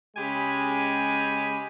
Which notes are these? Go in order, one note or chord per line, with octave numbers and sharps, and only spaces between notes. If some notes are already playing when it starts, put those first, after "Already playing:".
C#3 G#3 G4 G#5 B5